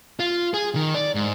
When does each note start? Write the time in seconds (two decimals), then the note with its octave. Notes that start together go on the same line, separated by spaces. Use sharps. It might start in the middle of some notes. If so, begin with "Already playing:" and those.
0.20 F4
0.54 G#4
0.75 D#3
0.94 D5
1.15 G#2